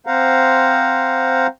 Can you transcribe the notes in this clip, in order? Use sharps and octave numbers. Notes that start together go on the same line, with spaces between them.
C4 C5 F5 F#5 A#5